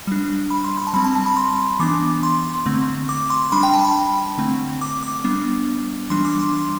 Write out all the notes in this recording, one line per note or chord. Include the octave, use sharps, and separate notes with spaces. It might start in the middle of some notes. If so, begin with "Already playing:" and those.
G3 D4
B5
C6
B5
A5
G3 C4 B5
A5
A5
B5
C6
E3 B3 D4 D6
C6
D3 A3 C4
D6
C6
G3 D4 B5
G5
A5
B5
D3 A3 C4
D6
D6
G3 B3 D4
E3 G3 D4 C6
D6
C6